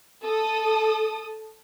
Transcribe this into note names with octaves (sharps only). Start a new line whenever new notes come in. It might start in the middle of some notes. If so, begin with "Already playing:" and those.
A4 D#6